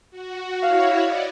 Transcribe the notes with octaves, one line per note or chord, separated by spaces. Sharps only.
F#4
E4 F#4 C#5 F5
D5 D#5